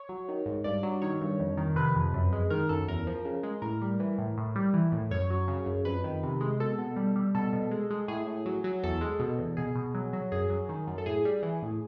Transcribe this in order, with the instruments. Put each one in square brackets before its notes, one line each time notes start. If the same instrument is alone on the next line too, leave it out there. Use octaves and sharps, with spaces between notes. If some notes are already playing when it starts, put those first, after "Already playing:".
Already playing: [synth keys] C#5
F#3
D#3
G#2
G2 D5
F#3
D#3 C#5
G2
F2
D#3
C3 B4
F2
F#2
G#3
D#3 A#4
F#2 A4
E2 A#4
F3
C#3
G#3
A2 A#4
G3
E3
A2
A2
G3
E3
A2
F#2 C#5
F#3
C#3
F#2
F2 B4
D#3
C3
G#3
B2 A4
B2
G3
G3
B2 A4
B2
G#3
G#3
A2 G#4
A2
F#3
F#3
E2 A4
G#3
B2
E2
B2 G#4
B2
F#3
F#3
F#2 G#4
F#3
D#3
F#2
A4
A2 G#4
G3
E3
A2